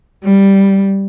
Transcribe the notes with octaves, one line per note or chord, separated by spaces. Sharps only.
G3